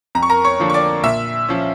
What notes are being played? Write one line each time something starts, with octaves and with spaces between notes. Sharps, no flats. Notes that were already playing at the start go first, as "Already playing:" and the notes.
F2 A#5
C#6
A#4 A#5
C#5 C#6
D3 F3 A#3 D4
C#6
D5 D6
A#2 E5 E6
F3 C#4